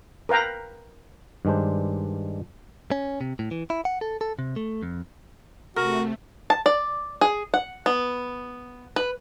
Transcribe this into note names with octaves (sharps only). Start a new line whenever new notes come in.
A#4 B4 F5 G5 A#5
G2 D#3 G#3 D4 C5
C#4
C3
A2
E3
E4
F#5
A4
A4
C3
A3
F2
C3 A3 F#4 A#4
A5
D5
G#4
F#5
B3
B4